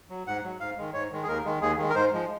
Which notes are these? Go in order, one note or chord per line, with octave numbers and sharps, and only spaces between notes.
F#3
G#2 F#5
F#3
G#2 F5
D#3 G#3
G#2 C#5
D#3 G#3
G#4
D#2 A#4
D#3 G#3
D#2 G#4
D#3 G#3
A#4
G#2 C5
F3 G#3